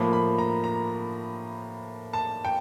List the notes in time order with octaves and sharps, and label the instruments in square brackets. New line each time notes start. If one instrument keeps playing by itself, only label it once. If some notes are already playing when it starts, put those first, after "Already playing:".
Already playing: [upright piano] A2 F3 A#3 B5
B5
A#5
A#5
A5
G5